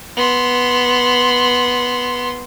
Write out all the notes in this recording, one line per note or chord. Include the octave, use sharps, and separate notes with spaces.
B3 C6